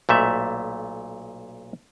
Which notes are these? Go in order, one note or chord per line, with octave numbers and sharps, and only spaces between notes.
B1 A#2 A3 E5